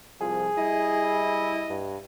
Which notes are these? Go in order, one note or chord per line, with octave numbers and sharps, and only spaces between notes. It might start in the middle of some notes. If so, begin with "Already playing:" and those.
C2 F3 G#4
G3 E4 D#5
G2